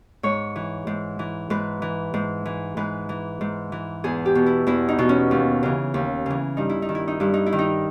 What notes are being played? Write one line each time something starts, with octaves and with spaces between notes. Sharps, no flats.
G#2 C#5
E3
G#2
E3
G#2 B4
E3
G#2
E3
G#2 B4
E3
G#2
E3
E2 G#4
G4
B2
E4
E2 E4
D#4
B2
C#4
D#2
C#3 E3
D#2
C#3 E3
G2 D#4
E4
D#4
D#3
E4
D#4
G2 E4
D#4
E4
D#3
D#4